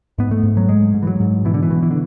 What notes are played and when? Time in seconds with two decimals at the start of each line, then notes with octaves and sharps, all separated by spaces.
0.18 G#2 B3
0.31 A3
0.43 G#2
0.57 F#3
0.69 G#2 G#3
0.94 G#2
1.02 E3
1.07 F#3
1.20 G#2
1.45 B2 E3
1.54 D3
1.63 E3
1.71 B2
1.83 E3
1.91 D3